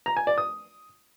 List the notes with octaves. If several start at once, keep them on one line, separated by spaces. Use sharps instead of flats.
A#5
G#5
D5
D#6